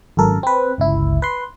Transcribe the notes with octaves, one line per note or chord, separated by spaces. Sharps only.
G#1 F#2 A4 A#4
C4 B4
G1 C#2 E4
B4 C6